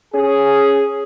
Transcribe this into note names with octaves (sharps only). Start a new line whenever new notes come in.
C#4 G#4